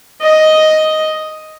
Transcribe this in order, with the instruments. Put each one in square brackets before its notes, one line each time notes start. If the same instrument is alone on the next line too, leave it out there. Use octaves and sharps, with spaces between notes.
[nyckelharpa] D#5